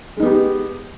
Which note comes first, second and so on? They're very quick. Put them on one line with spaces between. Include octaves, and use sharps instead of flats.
G#3 D#4 B3 G4